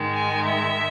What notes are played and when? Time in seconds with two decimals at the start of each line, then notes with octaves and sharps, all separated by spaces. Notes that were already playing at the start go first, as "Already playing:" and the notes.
Already playing: G#2 D#3 G#3
0.14 G#5
0.46 E5